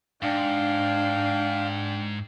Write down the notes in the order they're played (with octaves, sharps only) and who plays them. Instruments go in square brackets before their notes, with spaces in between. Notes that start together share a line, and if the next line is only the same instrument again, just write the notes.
[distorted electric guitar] G#2 [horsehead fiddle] D4 G5 [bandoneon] F5